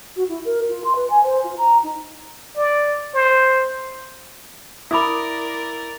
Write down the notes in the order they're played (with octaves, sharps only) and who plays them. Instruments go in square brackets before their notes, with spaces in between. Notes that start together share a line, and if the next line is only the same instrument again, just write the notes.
[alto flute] F#4
E4
A#4
F4
C6
B4
G#5
C5
F4
A#5
D#4
[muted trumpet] D5
C5
[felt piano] E4 [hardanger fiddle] A#4 D5 [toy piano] B5 D6 D#6